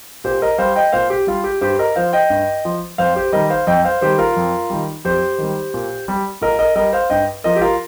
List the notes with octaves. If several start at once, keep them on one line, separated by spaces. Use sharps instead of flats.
A#2 G4 C5
A#4 D#5
G3 C5 F5
D#5 G5
A#2 C5 F5
G4
G3 F4
G4
G2 G4 C5
A#4 D#5
F3 C5 F5
D#5 G5
G2
F3
F2 C5 F5
G4 C5
D#3 G3 A#4 D#5
C5 F5
F2 D#5 G5
C5 F5
D#3 G3 G4 C5
F4 A#4
F2
D#3 G3
F2 G4 C5
D#3 G3
A#2
G3
A#2 A#4 D#5
A#4 D#5
G3 A#4 D#5
C5 F5
G2 D#5 G5
F3 A#4 D#5
G4
F4 A#4